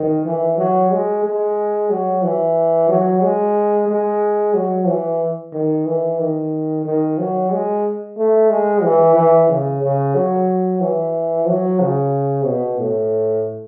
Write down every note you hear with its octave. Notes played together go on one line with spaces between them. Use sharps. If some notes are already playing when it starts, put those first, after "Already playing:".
Already playing: D#3
E3
F#3
G#3
G#3
F#3
E3
F#3
G#3
G#3
F#3
E3
D#3
E3
D#3
D#3
F#3
G#3
A3
G#3
E3
E3
C#3
C#3
F#3
E3
F#3
C#3
B2
A2